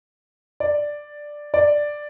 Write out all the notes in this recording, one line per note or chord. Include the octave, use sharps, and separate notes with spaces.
D5
D5